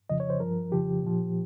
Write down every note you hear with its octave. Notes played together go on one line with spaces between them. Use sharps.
F2 C#3 F3 D#5
C#5
C5
G2 F3 A#4
F2 C#3 F3 G4
A#2 F3